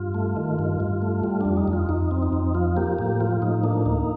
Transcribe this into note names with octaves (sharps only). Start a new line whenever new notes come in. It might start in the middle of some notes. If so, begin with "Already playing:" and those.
Already playing: G2 F4
A3
D#3
G2
G2
A3
G3 F4
F2 D4
D#4
F2
F4
F2 D#4
C4
D#4
F2
F3 F4
A#3 G4
A2 G4
F3 F4
A2 D#4
A#3 D4
D2 D#4